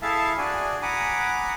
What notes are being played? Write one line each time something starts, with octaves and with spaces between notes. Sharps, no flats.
E4 G#4 A4 E5 F5 A5
D4 F#4 G#4 D5 G#5
F#5 G#5 A#5 B5 D6 D#6